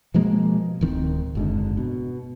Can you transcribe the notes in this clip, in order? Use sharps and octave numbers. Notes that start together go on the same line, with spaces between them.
B2 F3 G#3 A#3
D1 D#3 C4
F#1 G#2 D3
B2